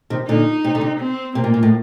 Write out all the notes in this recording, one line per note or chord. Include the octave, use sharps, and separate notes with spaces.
C3 D#3
A#2 D3 D#4
C3
D3
C3
C4
C3 A#3
A#2
A#2
A2